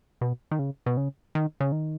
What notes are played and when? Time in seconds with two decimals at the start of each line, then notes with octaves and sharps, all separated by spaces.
0.21 B2
0.51 D#3
0.59 C#3
0.86 B2
0.97 C#3
1.35 D#3
1.60 C#3
1.72 D#3